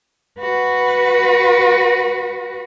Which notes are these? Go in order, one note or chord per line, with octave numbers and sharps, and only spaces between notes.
F#4 B4